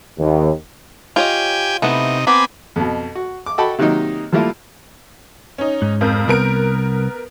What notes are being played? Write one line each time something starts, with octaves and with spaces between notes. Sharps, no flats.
D#2
F4 G4 C#5 D#5 G5 G#5
C3 A3 B3 D#4 E4
B3 C4 G#5 A#5 B5 D6
F2 B2
F#4
D6
F#4 A4 D#5 G5 A5 B5
C3 D#3 F#3 A#3 D#4
F3 G3 A3 A#3 E4 F4
C#4 D#4
G#2
F2 A#4 G6
C2 B3 A#4 D7